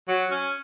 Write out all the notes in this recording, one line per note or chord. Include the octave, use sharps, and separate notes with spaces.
F#3
C#4